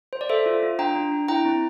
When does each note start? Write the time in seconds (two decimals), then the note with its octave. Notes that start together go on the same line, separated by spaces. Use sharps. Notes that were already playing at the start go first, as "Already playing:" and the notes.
0.13 C5
0.21 D5
0.29 A4 C5 E5
0.46 F4
0.63 F4
0.79 D4 G5 A#5
0.95 D4
1.12 D4
1.28 E4 G5 A#5
1.45 C4